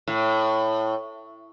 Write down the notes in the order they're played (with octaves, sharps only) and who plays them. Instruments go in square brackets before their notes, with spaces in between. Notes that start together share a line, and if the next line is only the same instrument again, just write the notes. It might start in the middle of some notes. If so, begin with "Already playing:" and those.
[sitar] A2